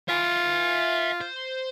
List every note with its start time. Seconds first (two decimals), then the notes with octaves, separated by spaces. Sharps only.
0.09 F4 E5 G#5
1.21 C5